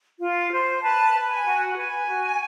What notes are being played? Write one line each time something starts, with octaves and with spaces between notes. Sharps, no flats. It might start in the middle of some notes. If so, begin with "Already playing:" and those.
F4
C5
B4 A5
B4
G#5
F#4
B4 G#5
F#4